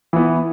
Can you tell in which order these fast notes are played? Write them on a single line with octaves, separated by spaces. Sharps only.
E3 B3 E4